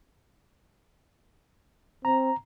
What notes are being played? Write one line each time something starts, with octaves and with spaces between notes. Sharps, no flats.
C4 A#5